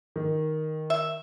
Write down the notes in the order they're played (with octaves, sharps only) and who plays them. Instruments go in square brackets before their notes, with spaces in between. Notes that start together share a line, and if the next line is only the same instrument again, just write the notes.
[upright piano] D#3
[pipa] E5